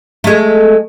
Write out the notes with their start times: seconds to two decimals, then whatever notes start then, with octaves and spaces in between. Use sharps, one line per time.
0.24 G#3 A3